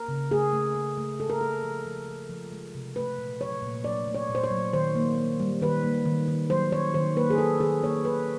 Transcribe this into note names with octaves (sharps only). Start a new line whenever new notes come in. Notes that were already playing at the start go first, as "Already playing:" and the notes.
Already playing: A#4
C#3
A3 G#4
A3
A3
A3
G#3 A4
A#4
G#3 A4
F3
F3
F3
F3
G#3
C3
A3 B4
A#2
F#3 C#5
A#2
F#3 D5
A3
C#5
A#2
C5
C#5
F#3
D#3 C5
A#3
A#3
G3
D#3 B4
A#3
D#3
D#3
F#3 C5
D#3 C#5
D#3 C5
A#3 B4
G#4
A#3 A4
D#3 G#4
A#3 C#5
D#3 B4